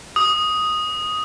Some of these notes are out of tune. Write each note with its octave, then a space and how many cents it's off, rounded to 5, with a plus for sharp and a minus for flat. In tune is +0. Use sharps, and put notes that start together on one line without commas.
D#6 +0